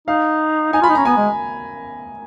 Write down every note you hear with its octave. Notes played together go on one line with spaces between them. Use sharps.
D#4 F5
D#4 G#5
F4 B5
D#4
C#4 A#5
B3 G#5
G#3